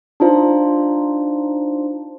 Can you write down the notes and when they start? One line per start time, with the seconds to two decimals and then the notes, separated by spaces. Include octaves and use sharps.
0.20 D4 D#4 F4 C5